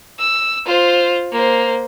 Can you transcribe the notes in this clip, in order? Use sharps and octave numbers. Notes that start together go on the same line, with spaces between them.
E6
F4 C5
A#3 C5